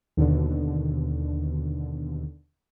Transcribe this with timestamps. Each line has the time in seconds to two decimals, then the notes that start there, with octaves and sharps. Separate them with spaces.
0.17 D#2 B2 D3